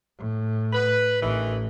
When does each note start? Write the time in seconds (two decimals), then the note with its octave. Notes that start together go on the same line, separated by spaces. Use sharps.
0.19 A2
0.73 B4
1.21 A1 D#3 E3